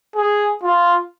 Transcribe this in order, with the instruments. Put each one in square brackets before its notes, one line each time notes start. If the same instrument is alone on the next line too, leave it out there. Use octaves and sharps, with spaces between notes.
[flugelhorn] G#4
F4